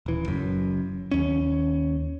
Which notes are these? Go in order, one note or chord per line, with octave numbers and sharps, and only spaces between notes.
D#1 E3
F#1 F#2
D#2 C#4